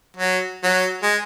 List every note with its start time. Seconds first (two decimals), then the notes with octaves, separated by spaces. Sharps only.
0.17 F#3
0.64 F#3
1.03 G#3